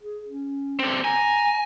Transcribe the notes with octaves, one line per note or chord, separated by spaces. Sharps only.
G#4
C#4
D3 C4
G#5 A#5